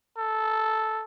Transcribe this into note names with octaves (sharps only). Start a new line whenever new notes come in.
A4